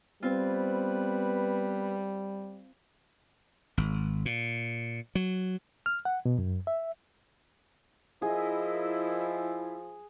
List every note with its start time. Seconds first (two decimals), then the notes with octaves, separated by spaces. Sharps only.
0.23 G3 B3 C4 F4 B4
3.77 G#1
4.25 A#2
5.15 F#3
5.86 F6
6.05 F#5
6.25 B2
6.38 F#2
6.67 E5
8.22 F3 E4 G#4 A#4 D#5